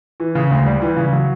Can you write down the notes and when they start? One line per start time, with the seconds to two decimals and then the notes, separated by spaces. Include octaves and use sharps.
0.20 E3
0.35 C#3
0.51 D2
0.66 G3
0.82 E3
0.97 C#3
1.13 F#3